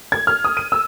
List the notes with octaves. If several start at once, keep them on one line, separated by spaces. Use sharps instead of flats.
G#6
F6
D#6
D#7
E6